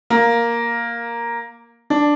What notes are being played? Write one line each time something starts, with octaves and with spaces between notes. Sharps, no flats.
A#3
D4